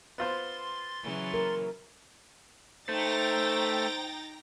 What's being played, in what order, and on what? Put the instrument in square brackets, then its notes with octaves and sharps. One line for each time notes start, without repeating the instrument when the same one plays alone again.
[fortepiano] B3 F4 C5 [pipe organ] C6 A6
[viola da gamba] C#3 E3 F#3
[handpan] A#4
[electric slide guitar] A3 [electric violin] D#4 A6 [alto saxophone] C5 [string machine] G5 A#5 A#6